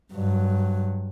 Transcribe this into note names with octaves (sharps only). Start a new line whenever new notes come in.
G2 F#3